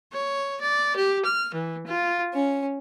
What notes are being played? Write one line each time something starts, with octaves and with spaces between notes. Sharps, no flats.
C#5
D5
G4
F6
E3
F4
C#4